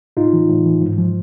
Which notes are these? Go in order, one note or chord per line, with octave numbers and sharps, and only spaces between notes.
A2 D#4 F4
E3
A2
E3
G#2
F3